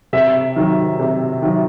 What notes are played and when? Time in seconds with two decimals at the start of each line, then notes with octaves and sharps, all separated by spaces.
0.13 C3 E5
0.56 D#3 F#3
0.99 C3
1.42 D#3 F#3